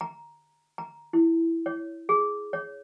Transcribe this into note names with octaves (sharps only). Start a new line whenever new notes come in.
A#5
A#5
E4
C#5
G#4
C#5